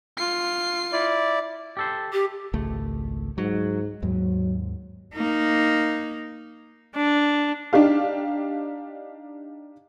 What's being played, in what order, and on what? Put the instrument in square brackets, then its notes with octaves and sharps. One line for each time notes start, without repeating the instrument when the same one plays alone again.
[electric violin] F4 C7
[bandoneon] E4 D5
[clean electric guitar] G4 A4 C5
[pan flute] G4
[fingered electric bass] G#1 C#2 A3
[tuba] G#2 [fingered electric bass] F#3
[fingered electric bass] D#2 G#2 [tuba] F#3
[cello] A#3 D#4
[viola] D4
[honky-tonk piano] D4 D#4 G4 F5